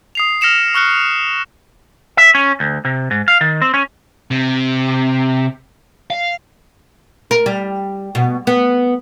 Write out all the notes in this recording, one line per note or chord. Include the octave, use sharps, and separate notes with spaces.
D#6 C7 F7
F6 A#6 C#7 E7 F7
C#6 F6 F#6 C#7
E5
C#4
D2
C3
G#2
F5
D#3
C4
C#4
C3
F5
A#4
G3
B2
B3